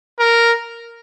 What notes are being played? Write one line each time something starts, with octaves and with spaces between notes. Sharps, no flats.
A#4